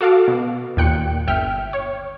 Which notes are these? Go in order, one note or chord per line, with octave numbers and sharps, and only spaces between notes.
F#4 A4 F5 D6
B2
D#2 A#2 G5 F#6 C#7
G1 E5 G5 F6
C#5